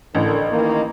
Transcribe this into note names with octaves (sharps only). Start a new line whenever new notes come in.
A1 D3 A#4
D#3 E3 A#3